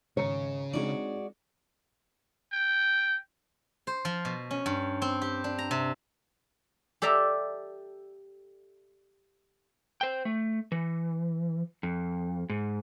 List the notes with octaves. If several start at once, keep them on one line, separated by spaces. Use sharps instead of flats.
G#1 C#3 C#5 A#5 C#7
G#3 C4 D4 D#4 F#4 D5
G5
C5
F3
B2
C#4
G2
C4
G4
D4
A#5
C3
G4 A4 D5 E5 A#5
C5 G5
A3
E3
F2
G#2